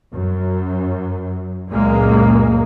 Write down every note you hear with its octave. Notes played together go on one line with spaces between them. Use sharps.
F#2
C#2 F#2 A#2 G#3 A#3